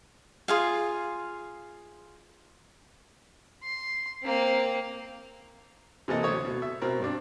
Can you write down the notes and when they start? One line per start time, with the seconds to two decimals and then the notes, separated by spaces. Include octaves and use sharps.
0.48 F4 G#4 F5
3.63 C6
4.23 A#3 C4
6.08 C3 E3 A#3 A4 D#5
6.23 D2 F#3 C5 C#5 D#6
6.45 B2
6.62 E5
6.82 B2 C4 A#4
7.00 G2 C4 D4